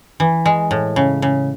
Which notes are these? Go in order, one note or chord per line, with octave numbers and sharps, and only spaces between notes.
E3
G#3
A2
C#3
C#3